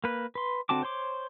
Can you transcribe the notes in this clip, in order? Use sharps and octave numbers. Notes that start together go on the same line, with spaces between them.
A#3 B4
B4 C6
D3 C4 F#4 A5 D6
C5 C#5 C6 D6